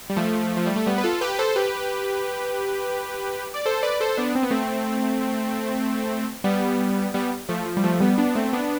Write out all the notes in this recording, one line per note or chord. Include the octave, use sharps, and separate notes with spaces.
G3
F3 A3
F3
G3
A3
G3 B3
B4
F4 A4
G4 B4
B4
A4 C5
G4 B4
D5
A4 C5
B4 D5
A4 C5
B3 D4
C4
B3
A3 C4
G3 B3
G3 B3
F3 A3
F3
G3
F3 A3
G3 B3
B3 D4
A3 C4
B3 D4